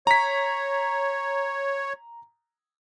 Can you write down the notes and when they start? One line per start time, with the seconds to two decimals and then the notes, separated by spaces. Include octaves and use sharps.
0.07 C#5 A#5 B6